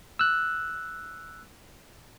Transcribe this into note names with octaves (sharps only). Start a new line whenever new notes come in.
E6 F#6